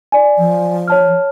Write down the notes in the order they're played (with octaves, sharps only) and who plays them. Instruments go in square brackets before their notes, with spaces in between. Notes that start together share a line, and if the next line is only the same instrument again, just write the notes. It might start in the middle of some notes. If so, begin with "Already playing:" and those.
[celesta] D5 G#5
[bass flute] F3
[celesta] C#5 A5 F6